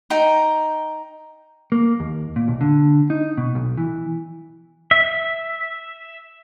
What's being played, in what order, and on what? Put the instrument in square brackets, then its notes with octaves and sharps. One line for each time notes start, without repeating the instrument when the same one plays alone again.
[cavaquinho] D#4 G5 A#5
[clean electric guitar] A#3
D#2
A#2
B1
D3
D#4
B2
B1
E3
[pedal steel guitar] E5